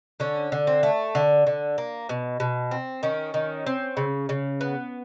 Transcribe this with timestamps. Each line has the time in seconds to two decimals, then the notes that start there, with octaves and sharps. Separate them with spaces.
0.20 D3 C#4
0.52 D3
0.67 C4
0.83 A3
1.15 D3
1.47 D3
1.78 A#3
2.09 B2
2.40 B2
2.71 C4
3.03 D#3 C#4
3.34 D#3
3.66 C4
3.97 C#3
4.29 C#3
4.61 B3